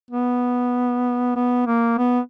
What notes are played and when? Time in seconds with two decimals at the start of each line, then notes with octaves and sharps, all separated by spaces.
0.11 B3
1.36 B3
1.67 A#3
1.98 B3